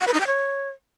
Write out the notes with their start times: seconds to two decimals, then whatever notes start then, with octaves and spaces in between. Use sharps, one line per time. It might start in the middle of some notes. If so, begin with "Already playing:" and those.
0.01 F#5
0.07 B4
0.14 D#4
0.20 G5
0.27 C#5